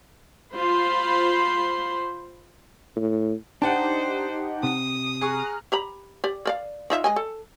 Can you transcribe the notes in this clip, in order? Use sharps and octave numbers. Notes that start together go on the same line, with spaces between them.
F4 C5 B5 C6
A2
D4 D#4 G4 C5 F#5 G5 A5
C3 D#6
G#4 A#5 C#6 F6 F#6
G4 A#5 B5
G4 D5
A#4 D5 F5
D#4 F4 E5
G#3 D#5 G#5
A4